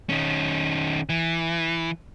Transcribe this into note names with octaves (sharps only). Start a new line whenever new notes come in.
D#3 C#4
E3